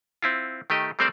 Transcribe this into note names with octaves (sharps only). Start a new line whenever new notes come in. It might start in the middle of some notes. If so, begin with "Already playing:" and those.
C4 E4 F4
D#3 A3 G4 D#5
G3 A3 C4 A#4 C5 D5